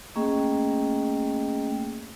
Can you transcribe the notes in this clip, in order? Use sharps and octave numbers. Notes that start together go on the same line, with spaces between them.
A3 A#3 C#4 G#4 D#5 G5